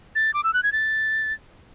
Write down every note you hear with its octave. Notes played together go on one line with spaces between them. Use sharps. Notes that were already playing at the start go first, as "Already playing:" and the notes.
A6
D6
E6
F#6
G#6
A6